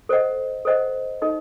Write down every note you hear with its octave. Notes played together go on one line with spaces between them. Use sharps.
A4 C5 D#5 F#5
A4 C5 D#5 F#5
D#4 A4 D#5